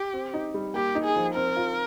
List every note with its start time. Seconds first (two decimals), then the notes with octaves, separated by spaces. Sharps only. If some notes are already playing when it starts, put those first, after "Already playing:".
Already playing: G4
0.14 C4
0.34 D#4
0.54 G3
0.74 A#3 G4
0.95 D#4
1.05 G#4
1.16 F3
1.35 C4 A#4
1.57 F4